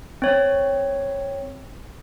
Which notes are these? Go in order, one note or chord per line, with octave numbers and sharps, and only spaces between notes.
C4 C#5